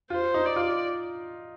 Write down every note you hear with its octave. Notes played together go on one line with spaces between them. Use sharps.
F4 C5
D#4
D5
F4